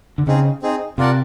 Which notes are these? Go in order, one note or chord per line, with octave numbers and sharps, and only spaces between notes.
D3
C#3 C4 D#4 G#4
C4 D#4 G#4
C3 F4 A#4 D5 F#5 A5